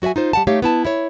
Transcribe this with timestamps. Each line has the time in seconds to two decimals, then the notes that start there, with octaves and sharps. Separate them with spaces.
0.02 F#3 F#4 D5 E5 G#5
0.16 D#4 F4 C5
0.33 G3 F#5 A5
0.47 A3 D#4 G4 C#5 F5
0.62 B3 E4 A5
0.85 E4 C#5